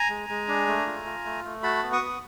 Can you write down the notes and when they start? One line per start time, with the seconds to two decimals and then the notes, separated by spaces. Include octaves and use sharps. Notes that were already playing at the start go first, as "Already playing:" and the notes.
Already playing: G#5 A#5
0.10 G#3
0.29 G#3
0.48 D4
0.68 A3
0.86 F4
1.06 F4
1.25 A3
1.45 A3
1.63 F#4 A5 B5
1.83 B3
1.92 C#6 D#6
2.01 B3